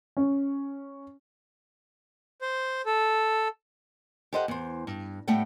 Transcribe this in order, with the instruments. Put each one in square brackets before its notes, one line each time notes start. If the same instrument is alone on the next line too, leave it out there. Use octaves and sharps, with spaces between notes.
[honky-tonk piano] C#4
[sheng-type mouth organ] C5
A4
[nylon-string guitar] G4 A4 C5 D#5 F5 F#5
E2 C5
G2
A2 G3 A3 B3 F#5 G5